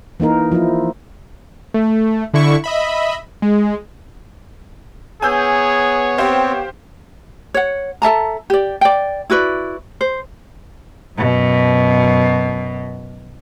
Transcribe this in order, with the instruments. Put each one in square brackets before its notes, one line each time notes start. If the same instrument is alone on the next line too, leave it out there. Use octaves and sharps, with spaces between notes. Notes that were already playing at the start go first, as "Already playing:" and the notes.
[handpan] E3 A#3 D#4 A#4
F3 E4
[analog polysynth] A3
D3 E4 C#6
D#5 E5 B5
G#3
[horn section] B3 C#5 [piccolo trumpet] G#4 [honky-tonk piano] G#5 E6 G6
[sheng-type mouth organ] C4 [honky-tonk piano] G4 C5 F5
[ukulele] C#5 F#5
A4 E5 A5 A#5
G4 D5
D5 G5
E4 F#4 B4 D5
C5
[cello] F#2 B2